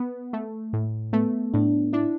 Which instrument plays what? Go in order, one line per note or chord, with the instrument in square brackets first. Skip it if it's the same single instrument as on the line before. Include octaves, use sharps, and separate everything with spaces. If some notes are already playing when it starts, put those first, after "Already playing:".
Already playing: [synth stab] B3
A3
A2
[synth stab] A3 [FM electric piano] B3
[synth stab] A2 [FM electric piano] D4
[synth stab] D4 [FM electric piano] E4